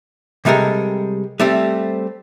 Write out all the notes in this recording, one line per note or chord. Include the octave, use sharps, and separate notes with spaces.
C3 G3 G#3 A4 A#4
G3 A3 C4